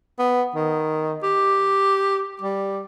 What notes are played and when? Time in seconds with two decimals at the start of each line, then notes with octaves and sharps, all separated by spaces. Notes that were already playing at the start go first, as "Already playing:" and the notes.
0.19 B3
0.55 D#3
1.23 G4
2.42 G3